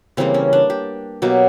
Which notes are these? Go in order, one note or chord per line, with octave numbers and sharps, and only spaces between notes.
C#3 E3 G3 A#3 C4
C#4
D4
G4
B2 F#3 A#3 G4